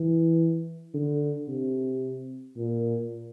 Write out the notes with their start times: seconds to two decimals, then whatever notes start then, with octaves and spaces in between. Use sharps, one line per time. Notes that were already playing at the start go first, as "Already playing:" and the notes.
Already playing: E3
0.94 D3
1.48 C3
2.56 A#2